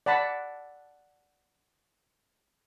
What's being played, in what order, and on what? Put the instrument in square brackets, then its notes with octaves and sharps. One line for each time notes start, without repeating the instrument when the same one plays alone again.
[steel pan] D5 F#5 A5 B5